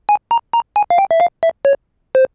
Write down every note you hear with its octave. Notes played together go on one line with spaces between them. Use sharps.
G#5
A#5
A#5
G#5
F5
G5
E5
F5
E5
C#5
C5